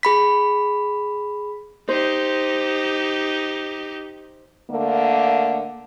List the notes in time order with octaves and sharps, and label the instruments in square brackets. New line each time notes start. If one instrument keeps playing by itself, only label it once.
[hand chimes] G#4 B5 B6
[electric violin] D#4 G4 [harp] C5
[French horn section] D3 A3 A#3